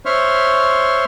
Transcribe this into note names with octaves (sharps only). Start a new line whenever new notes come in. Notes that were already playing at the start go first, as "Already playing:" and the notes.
C5 C#5 E5 C6 C#6 F6